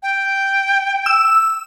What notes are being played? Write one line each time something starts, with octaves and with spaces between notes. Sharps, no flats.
G5
E6